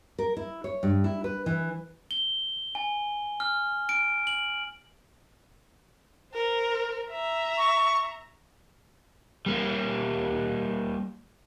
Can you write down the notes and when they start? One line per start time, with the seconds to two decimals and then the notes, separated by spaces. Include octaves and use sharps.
0.18 A#4
0.37 E4
0.64 C#5
0.83 G2
1.04 E4
1.24 B4
1.46 E3
2.11 G7
2.75 G#5
3.40 F6
3.89 D7
4.27 F#7
6.34 A#4 C5
7.10 E5 A#5
7.58 C#6
9.46 G3 A#3